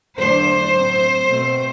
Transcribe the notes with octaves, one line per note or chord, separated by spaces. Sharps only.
E2 D3 F#3 A3 D4 C5
A2 F#3 C4
B2 A3 C4